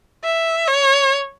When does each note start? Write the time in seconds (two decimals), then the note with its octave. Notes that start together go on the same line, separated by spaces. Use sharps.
0.24 E5
0.68 C#5